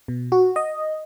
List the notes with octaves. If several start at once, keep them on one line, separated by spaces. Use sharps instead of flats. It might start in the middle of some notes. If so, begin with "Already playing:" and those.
B2
F#4
D#5